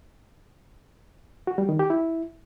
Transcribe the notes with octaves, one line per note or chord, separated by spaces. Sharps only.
F#4
G3
D#3
G4
E4